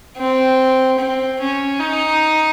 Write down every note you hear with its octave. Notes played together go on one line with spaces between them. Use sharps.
C4
C4
C#4
D#4